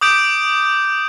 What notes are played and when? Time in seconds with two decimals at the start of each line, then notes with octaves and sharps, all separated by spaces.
0.01 D6 D#6 G6 D7